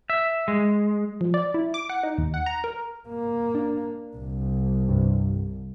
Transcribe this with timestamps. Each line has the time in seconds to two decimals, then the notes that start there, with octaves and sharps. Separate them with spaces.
0.10 E5
0.48 G#3
1.21 F3
1.34 D5
1.54 E4
1.74 D6
1.90 F#5
2.03 D#4
2.18 D#2
2.34 F#5
2.46 A#5
2.64 A#4
3.08 A#3
3.55 D4
4.16 C2
4.89 G2 C3